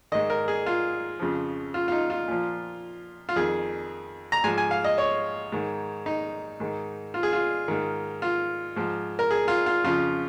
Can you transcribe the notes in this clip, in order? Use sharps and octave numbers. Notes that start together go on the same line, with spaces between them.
G#2 D#3 D#5
A#4
G#4
F4
F2 C#3 F3
F4
F4
D#4
F4
A#2 F3
F4
F2 D#3 G#4
A#5
G#2 F3 G#5
G#5
F5
D#5
C#5
G#2 D#3
D#4
G#2 D#3
F4
G#4
F4
G#2 D#3
F4
G#2 F3
A#4
G#4
F4
F4
F2 C#3 F3 F4